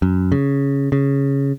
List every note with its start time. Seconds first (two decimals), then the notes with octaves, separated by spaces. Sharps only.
0.02 F#2
0.32 C#3
0.92 C#3